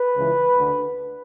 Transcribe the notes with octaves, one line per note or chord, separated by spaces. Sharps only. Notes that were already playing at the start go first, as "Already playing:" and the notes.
Already playing: B4
C#2 C#3 E3
D2 D3